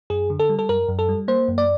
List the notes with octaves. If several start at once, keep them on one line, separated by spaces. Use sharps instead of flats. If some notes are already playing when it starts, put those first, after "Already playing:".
F#2 G#4
D3
A4
G3
A4
F#2 A#4
F#2
A4
G3
A#3 C5
F#2
D5